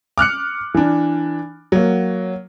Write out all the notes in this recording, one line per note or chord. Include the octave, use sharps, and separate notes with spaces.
D6 F6 F#6 C#7
E3 D4
F#3 A#3